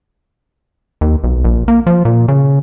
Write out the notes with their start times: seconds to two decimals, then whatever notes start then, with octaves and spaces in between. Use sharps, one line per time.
1.01 D#2
1.24 B1
1.45 A#1
1.68 A#3
1.87 F3
2.05 A#2
2.28 C#3